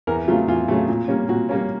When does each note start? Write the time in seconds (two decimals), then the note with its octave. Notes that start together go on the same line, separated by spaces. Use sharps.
0.07 E2 A#4
0.28 C#3 F#3 A3 F4
0.48 E2 F4
0.68 C#3 F#3 A3
0.88 A#2
1.08 G3 A#3 C#4
1.28 A#2 F#4
1.49 G3 A#3 C#4